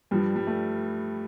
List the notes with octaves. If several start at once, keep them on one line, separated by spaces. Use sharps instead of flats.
G2 F3 G3
G3
A3